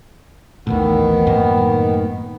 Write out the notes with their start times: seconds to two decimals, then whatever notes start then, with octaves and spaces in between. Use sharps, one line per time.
0.67 A1 D#2 A2 D#3 B3
1.27 F#2 A2 A#3